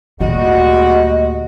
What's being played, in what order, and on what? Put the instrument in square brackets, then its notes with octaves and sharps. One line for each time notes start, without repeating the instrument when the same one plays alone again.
[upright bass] D2 A#2 [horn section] G3 G#3 F#4 [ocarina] D#5